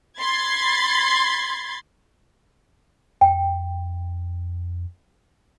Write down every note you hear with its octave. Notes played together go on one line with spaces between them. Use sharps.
B5 C6 G#6 A6
F2 G5